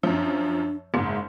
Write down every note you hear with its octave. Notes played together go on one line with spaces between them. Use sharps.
F#2 F3 D4
F#1 G#2 G#3